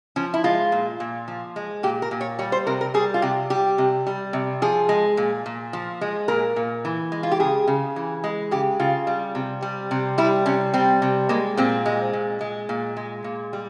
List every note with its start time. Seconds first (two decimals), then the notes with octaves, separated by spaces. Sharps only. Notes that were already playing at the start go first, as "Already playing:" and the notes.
0.16 F3 C#4
0.34 E4
0.44 G#3 F4
0.72 A#2
1.00 A#2
1.28 F3
1.56 G#3
1.83 A#2 G4
2.02 A#4
2.11 A#2
2.21 C#5
2.39 G3 C#5
2.52 C5
2.67 C3 A#4
2.81 A#4
2.94 G3 G#4
3.14 F4
3.22 C3 G4
3.50 G3 G4
3.78 C3
4.07 G3
4.33 C3
4.62 F3 G#4
4.89 G#3
5.17 A#2
5.46 A#2
5.73 F3
6.01 G#3
6.28 A#2 A#4
6.56 A#2
6.85 E3
7.12 G#3
7.23 F4
7.32 G4
7.40 C#3 G#4
7.67 C#3
7.96 E3
8.24 G#3
8.51 C#3 G4
8.79 C#3 F4
9.07 G3
9.35 C3
9.62 G3
9.91 C3
10.18 G3 E4
10.46 C3 C#4
10.74 G3 C4
11.02 C3
11.29 G#3 A#3
11.57 A#2 C4
11.86 G#3
12.13 A#2
12.41 G#3
12.69 A#2
12.97 G#3
13.24 A#2
13.53 G3